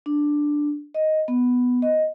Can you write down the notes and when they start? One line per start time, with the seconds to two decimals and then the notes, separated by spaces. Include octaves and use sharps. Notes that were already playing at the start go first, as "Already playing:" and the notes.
0.06 D4
0.95 D#5
1.28 B3
1.82 D#5